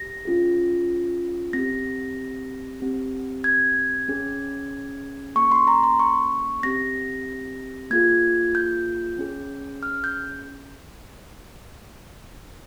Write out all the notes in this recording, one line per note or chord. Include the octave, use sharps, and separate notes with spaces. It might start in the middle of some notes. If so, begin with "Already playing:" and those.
Already playing: G4 A#6
C#4 F4 G#4
C4 G4 A#6
C4 G4
G#6
C#4 G#4
A#3 C#4 G#4 C#6
C6
A#5
C6
C#6
C4 G4 A#6
A#3 F4 G#4 G#6
G6
C#4 G#4
F6
G6